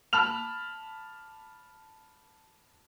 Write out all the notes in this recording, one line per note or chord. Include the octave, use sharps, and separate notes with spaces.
A5 B5 F6 F7